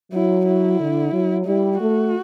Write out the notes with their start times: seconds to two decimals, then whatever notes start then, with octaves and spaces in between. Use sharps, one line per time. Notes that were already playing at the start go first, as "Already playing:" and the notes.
0.12 F#3 E4
0.47 E4
0.79 D3
1.12 F#3
1.46 G3 E4
1.80 A3 F#4